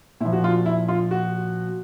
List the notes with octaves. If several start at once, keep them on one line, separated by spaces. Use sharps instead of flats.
A#2 F3 E4
F#4
F4
E4
F4
F#4